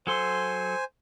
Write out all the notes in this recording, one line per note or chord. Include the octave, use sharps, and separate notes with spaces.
F#3 A4 C5 G#5 C6